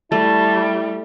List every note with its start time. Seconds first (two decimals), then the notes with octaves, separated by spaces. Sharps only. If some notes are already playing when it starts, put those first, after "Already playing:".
0.12 G3 A3 E4 A5